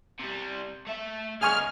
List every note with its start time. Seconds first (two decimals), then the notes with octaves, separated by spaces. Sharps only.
0.20 C3 G3
0.87 A3 E5
1.41 C#2 G#2 G#4 G#5 C#6 F6